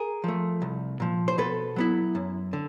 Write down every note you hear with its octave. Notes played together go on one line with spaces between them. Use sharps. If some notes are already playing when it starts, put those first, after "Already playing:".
Already playing: G#4 A#4
F3 A3
C2
A#2 F3
C5
B2 A4 B4
F#3 B3 E4
F#2
D3